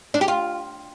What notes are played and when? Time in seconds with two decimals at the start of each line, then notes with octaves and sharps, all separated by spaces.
0.14 D4
0.21 G4
0.28 F4